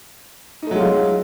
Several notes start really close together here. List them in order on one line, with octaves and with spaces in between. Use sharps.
D#4 A3 F#3 G#3 F4